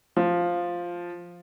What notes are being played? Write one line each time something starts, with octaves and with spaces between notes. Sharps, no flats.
F3